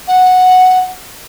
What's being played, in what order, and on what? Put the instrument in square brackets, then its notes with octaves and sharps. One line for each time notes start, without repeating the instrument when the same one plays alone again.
[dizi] F#5